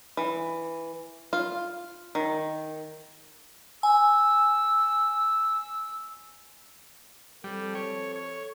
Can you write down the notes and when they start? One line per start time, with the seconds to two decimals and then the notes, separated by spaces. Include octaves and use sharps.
0.17 E3
1.33 F4
2.15 D#3
3.83 G#5 E6
7.44 F3 G3 C4 A4
7.75 C#5
8.16 C#5